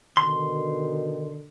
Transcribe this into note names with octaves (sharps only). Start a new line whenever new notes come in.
B2 D3 D#3 C6